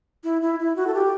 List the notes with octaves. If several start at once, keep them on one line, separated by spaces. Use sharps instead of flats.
E4
E4
E4
F#4
A4
G4